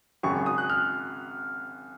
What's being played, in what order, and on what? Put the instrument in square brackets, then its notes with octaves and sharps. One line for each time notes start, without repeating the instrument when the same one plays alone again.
[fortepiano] G#1 F#2 C#3 [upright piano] C#6
[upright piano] D#6
F#6
F6